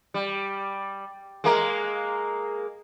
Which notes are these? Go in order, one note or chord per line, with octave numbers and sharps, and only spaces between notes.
G3
G#3 A#3 A#4